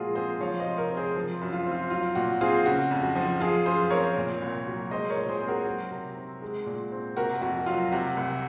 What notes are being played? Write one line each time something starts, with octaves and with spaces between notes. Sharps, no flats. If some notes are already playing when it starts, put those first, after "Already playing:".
Already playing: A#2 F3 G#3 F4 F#4 G#4 A#4
C4 G#4 C5
F3 C#5 F5
C5 D#5
C3
A#4 C#5
C4
G#4 C5
F3
F#2
F4
C4
F4
F#3 F4
A#2 F#4
C4 F4 G#4
C#3 F#4
F2
F#4
F3
F3 F4 G#4
F#2 G#4 C5
C4 A#4 C#5
A#2
C2
F#3
G#3 C5 D#5
A#4 C#5
A#2
G#4 C5
C4 G#4
F#4 A#4
F#3
C3
C4
G#3
A#2
C4
C3 F#4 A#4
F2 F#4
F#3 F4
C3 F#4
C2